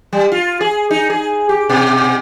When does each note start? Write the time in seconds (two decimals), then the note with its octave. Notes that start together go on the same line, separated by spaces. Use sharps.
0.13 G3
0.32 F4
0.61 G#4
0.91 D#4
1.10 G#4
1.49 G4
1.69 B2